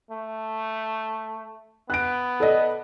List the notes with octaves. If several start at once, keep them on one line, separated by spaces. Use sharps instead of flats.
A3
B3 F#6 D7
A4 D5 D#5